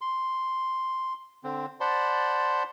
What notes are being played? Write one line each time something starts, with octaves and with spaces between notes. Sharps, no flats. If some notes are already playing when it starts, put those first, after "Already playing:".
C6
D3 C4
C5 D5 F#5 A5 B5 C6